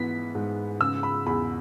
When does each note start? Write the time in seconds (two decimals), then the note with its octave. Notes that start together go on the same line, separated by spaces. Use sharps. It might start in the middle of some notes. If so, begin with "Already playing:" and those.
Already playing: G#2 E3 B3 B6
0.35 G#2
0.80 C#3 E6
1.03 B5
1.26 E2 B5